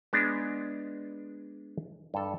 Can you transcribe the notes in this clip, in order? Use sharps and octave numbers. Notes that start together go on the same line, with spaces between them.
G#3 B3 D4
G2 A4